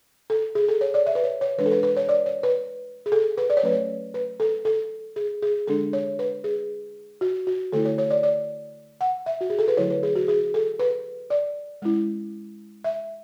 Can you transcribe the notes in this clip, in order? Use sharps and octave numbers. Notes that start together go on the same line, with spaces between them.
A4
G#4
A4
C#5
D5
E5
B4
C#5
C#5
E3 G#3 D4 B4
A4
B4
B4
C#5
D5
C#5
B4
G#4
A4
B4
D5
C#5
F#3 A3 C#4 B4
C#5
B4
A4
A4
G#4
G#4
D3 G#3 D4 A4
C#5
B4
G#4
F#4
F#4
D3 A3 E4 A4
C#5
C#5
D5
D5
F#5
E5
F#4
G#4
A4
B4
D3 F#3 A3 E4 C#5
B4
G#4
F#4
G#4
A4
B4
D5
G#3 C#4 E4
E5